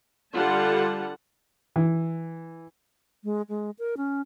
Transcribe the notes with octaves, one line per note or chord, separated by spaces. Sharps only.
D3 G3 F4 F#5 A5
E3
G#3
G#3
A#4
C#4